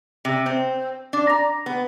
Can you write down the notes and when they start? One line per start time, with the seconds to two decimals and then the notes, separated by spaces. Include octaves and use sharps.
0.25 C3
0.46 C4
1.13 D4
1.29 A#5
1.66 B3